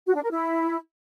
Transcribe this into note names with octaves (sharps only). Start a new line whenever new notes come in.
F#4
D4
A#4
E4